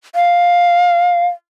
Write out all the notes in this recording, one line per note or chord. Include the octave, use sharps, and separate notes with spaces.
F5